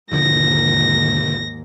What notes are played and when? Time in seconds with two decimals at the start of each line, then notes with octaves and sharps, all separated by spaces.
0.12 E1 D#2 G#2 D3 F3 A#6